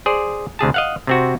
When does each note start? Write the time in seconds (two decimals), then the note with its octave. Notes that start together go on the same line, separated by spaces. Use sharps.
0.06 G#4 C5 D5
0.59 D2 C3 G#4 A5
0.74 D#5 F5 F#5
1.07 C3 C4 F#4